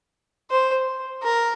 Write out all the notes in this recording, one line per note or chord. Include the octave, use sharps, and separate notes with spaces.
C5
A#4